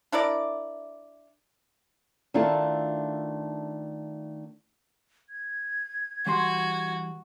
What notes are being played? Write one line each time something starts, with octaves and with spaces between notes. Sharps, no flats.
D4 E4 A#4 D5
D#3 A3 D4 E4 F4 A4
G#6
E3 G3 F#4 C6